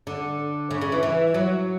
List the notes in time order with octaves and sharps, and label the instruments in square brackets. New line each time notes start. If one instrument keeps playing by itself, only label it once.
[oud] D3
C#3
C#3
E3
E3
F#3